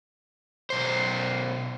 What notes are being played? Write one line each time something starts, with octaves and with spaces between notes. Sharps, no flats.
B1 C5